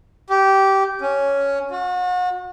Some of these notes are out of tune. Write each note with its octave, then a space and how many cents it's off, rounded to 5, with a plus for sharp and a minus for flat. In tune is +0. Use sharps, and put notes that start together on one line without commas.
G4 -15
C#4 +5
F#4 -35